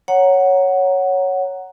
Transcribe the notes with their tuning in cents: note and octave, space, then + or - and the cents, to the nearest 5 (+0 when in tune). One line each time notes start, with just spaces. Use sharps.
C#5 +0 F#5 +0 A#5 +0